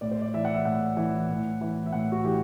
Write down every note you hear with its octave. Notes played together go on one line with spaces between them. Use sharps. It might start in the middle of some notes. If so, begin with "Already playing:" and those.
A2 D5
C5
D5
E3 E5
F#5
E5
A2 F#5
E3
A2
E3
E5
A2 F#5
F#4
E3 G4